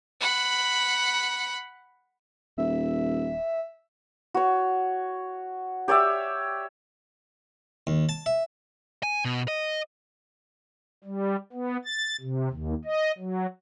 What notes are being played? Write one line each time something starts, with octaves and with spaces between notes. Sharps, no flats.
F#5 B5
D#1 E5
F#4 C#5
G4 C#5 D5 E5
D#2
A5
E5
G#5
B2
D#5
G3
B3
A6
C3
D#2
D#5
F#3